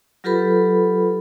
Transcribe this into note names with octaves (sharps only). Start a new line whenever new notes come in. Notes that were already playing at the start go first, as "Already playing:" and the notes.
F#3 F4 G4 A4 B4 B5